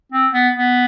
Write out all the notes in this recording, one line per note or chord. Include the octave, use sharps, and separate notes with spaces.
C4
B3
B3